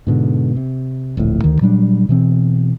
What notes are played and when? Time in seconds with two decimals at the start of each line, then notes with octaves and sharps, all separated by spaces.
0.07 G#2 B2 D3
0.57 C3
1.17 D1 A#1 A2
1.44 D2 D3 D#3
1.61 A#2 F#3 G3 D4
2.09 B2 E3 C4